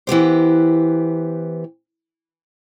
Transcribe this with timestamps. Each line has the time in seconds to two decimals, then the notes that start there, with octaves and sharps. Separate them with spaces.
0.07 E3 B3 G4 C5